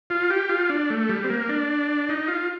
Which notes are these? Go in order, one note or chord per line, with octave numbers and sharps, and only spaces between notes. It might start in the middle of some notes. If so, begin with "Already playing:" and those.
F4
G4
F4
D4
A3
G3
C4
A#3
D4
D#4
F4